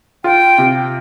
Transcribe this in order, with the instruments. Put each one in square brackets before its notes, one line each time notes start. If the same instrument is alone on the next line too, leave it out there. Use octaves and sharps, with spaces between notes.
[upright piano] F4 [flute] G5
[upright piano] C3